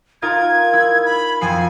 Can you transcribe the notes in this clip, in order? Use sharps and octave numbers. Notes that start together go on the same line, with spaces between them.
D#4 F4 A#4 G#6
E4
B5
F2 F3 G#5 C7